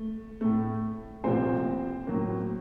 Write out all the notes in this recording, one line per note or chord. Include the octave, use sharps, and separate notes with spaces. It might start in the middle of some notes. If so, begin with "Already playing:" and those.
Already playing: A3
A2 A3
C2 A#2 F3 A3 C4 C5
A2 F#3 A#3